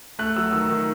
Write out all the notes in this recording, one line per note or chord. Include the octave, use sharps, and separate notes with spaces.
A3 F#6
F#3 E6
D#3 E6
D#3